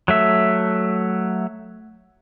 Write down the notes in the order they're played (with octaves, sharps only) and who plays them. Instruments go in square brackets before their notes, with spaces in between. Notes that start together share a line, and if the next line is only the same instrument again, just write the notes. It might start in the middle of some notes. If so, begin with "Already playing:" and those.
[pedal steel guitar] F#3 A3 E5